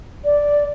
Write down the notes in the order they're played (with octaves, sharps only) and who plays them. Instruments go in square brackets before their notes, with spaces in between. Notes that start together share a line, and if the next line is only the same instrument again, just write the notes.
[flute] D5